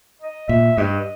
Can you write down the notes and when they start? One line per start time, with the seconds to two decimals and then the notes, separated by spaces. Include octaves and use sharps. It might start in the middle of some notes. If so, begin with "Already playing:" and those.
0.22 D#5
0.49 A#2 E5
0.78 G2 D#5